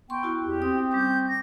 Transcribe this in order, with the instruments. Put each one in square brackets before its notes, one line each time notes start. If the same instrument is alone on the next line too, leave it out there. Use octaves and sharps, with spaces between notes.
[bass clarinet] B3 [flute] G5 [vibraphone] C6 C#6
[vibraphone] E4 F#4
[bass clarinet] E2 [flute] G4
[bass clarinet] C4 [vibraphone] D#6
[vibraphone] G3 C#4 D6 [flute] G6
[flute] A#6